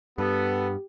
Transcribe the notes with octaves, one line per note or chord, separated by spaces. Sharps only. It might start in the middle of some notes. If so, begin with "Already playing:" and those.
G2 B3 G4 A4 B4